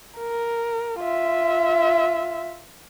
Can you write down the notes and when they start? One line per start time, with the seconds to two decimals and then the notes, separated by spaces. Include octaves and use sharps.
0.18 A#4
1.01 F4 E5